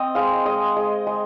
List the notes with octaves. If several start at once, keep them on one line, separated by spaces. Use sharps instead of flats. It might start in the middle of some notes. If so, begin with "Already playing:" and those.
Already playing: C4 D#5
G#3 F5
G#3 D#5
G#3
G#3